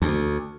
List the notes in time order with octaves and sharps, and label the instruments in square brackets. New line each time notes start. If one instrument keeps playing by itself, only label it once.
[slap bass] D2